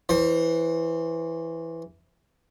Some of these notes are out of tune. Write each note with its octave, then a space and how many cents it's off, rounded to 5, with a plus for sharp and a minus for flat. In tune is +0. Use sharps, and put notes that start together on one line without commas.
E3 +0 C5 +30